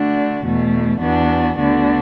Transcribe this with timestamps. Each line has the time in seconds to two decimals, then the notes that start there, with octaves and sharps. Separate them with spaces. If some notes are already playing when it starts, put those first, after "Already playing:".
Already playing: D3 A3 D4 F#4
0.45 E2 B2 A3
1.01 E2 E3 B3 D4 F#4
1.58 D2 D3 B3 D4 F#4